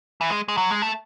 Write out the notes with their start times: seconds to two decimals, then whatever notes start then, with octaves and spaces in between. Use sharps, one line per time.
0.21 E3
0.30 G#3
0.48 G#3
0.57 F#3
0.71 G#3
0.82 A3